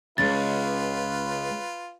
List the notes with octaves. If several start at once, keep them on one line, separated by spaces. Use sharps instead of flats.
C#2 G#3 C#4 F4 G#4 B4 A6